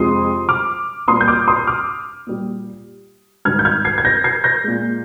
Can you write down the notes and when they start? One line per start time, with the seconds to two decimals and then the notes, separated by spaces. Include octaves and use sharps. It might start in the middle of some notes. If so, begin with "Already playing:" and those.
Already playing: F2 C3 F3 G#3 C6 D#6
0.49 D6 F6
1.08 A#2 G3 C6 D#6
1.21 G6
1.28 D6 F6
1.48 C6 D#6
1.67 D6 F6
2.27 A#2 G3
3.45 G#2 D#3 G3 F6 G#6
3.59 G6
3.65 F6 G#6
3.85 G#6 C7
3.98 G#6
4.05 G6 A#6
4.24 G#6 C7
4.44 G6 A#6
4.64 A#2 G#3